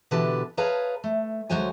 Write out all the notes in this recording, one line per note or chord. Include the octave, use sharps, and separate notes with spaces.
B2 D3 E3 G4 B4 A5
G#4 B4 C#5 F5 A5 A#5
A3
D2 F#3 G#3 C5 C#5 G#5